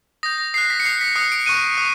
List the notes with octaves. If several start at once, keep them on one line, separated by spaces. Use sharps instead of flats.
D#6 G6 A#6
A#6
D#6 F#6 C7
B6
C#7
D#6 F#6 C7
B6
D#6 F#6 C#7
D7
C#6 F#6 D#7
D#6 F#6